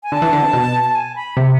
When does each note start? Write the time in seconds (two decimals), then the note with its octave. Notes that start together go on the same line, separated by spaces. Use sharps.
0.03 G#5
0.12 D3 A5
0.22 E3
0.33 D3
0.43 C3
0.53 B2
0.84 A5
0.95 G#5
1.16 B5
1.37 C3 E5